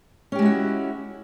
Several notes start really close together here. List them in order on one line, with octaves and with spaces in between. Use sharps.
C#4 G4 G#3 E4 F#4